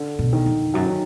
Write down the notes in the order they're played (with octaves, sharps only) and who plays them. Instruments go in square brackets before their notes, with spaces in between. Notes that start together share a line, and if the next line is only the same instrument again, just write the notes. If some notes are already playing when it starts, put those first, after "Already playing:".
Already playing: [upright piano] D3
[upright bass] B2
[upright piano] D#3
[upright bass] F2
[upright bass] F#2 [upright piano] F#3
[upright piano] D#3